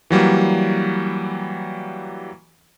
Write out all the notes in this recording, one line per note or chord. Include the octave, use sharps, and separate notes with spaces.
E3 F#3 G3 A#3